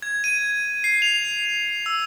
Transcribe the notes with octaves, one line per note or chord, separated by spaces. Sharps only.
G#6
D#7
C7
F7
E6